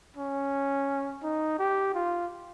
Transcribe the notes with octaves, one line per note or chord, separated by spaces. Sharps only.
C#4
D#4
G4
F4